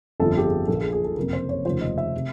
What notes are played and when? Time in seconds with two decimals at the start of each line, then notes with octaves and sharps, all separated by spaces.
0.20 G1 F2 D3 F3 A4
0.37 G4
0.44 G#4
0.68 A#1 A#2 F3 A4
0.80 G#4
0.93 G#4
1.04 A4
1.17 F#1 F2 C3 A#4
1.33 C5
1.49 C#5
1.65 F1 D#2 C#3 F3 C5
1.81 D#5
1.98 E5
2.16 C3